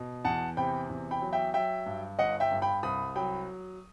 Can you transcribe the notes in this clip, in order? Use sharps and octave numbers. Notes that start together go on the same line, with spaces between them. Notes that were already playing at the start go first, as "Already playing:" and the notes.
Already playing: B2
E2 F#5 A5
C3 G5 B5
E2
G5 B5
F#3
E5 G5
F#3 E5 G5
G2
G1 D#5 F#5
E5 G5
G2
G5 B5
C2 B5 D#6
F#3 G5 B5